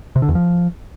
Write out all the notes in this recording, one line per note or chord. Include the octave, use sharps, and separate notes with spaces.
C3
D3
E2
F3